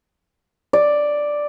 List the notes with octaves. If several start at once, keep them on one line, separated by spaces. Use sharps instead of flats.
D5